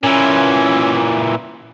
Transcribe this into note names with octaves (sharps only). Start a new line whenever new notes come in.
A#2 E3 C#4